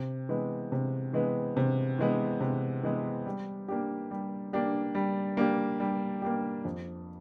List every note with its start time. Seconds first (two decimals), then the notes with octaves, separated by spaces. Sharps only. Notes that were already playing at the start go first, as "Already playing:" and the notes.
Already playing: C3
0.29 E3 G#3 B3
0.72 C3
1.13 E3 G#3 B3
1.57 C3
1.99 E3 G#3 B3
2.41 C3
2.83 E3 G#3 B3
3.26 G3
3.68 A#3 D4 G4
4.11 G3
4.53 A#3 D4 G4
4.95 G3
5.37 A#3 D4 G4
5.80 G3
6.22 A#3 D4 G4
6.65 F2